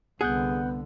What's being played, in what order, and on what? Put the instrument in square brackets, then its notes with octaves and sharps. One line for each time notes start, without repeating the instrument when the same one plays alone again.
[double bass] C2 D3 [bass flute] B3 [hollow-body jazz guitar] G#4 [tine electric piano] F#5 F#6 G6